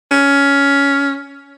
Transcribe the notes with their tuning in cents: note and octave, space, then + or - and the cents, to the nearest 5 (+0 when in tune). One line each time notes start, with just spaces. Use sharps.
C#4 +15